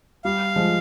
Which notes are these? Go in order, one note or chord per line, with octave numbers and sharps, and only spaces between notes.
G3 F5
F3 G#3